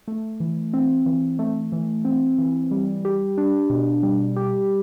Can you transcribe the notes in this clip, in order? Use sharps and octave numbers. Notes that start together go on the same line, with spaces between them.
A3
E3
C4
E3
A3
E3
C4
E3
G3
G4
D4
B2
G3
G4